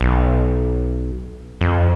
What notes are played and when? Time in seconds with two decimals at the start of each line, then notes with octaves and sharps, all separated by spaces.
0.01 B1
1.61 F2